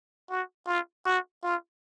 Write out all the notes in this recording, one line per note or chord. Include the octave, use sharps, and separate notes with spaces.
F#4
F4
F#4
F4